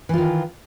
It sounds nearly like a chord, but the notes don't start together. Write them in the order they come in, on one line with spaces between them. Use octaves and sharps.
E3 F4 D#3